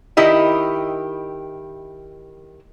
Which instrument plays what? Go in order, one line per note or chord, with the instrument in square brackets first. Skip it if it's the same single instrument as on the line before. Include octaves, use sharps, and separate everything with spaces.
[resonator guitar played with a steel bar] D#3 E4 G4 D#5